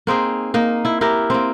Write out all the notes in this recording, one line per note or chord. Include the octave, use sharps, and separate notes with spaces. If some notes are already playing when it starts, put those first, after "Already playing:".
A#3 C4 D#4 G#4
A#3 D#4
E4
E4 G4 A#4
A#3 C4